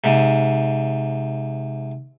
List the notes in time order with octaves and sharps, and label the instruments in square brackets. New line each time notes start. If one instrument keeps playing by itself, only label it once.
[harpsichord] G#2 C3